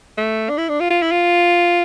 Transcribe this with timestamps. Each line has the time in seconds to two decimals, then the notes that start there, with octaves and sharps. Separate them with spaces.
0.17 A3
0.50 D4
0.58 E4
0.69 D4
0.80 F4
0.91 F4
1.02 E4
1.11 F4